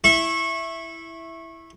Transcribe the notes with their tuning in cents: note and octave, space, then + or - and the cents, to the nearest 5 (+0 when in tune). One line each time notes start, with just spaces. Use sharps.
E4 +0 C#6 -25